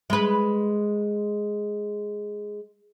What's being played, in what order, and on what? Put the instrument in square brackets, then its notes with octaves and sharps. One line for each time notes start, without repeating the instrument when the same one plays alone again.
[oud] G#3 B4